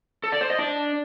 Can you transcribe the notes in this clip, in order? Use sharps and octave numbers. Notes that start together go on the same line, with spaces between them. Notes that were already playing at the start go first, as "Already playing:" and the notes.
A4
D5
C5
D#5
D4